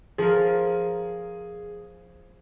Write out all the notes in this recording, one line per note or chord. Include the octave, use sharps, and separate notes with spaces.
F3 G#4 A#4